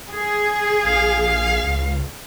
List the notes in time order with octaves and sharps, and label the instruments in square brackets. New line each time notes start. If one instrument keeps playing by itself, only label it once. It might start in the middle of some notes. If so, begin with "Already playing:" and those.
[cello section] G#4
[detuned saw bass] A#1 [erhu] F5
[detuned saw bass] C#2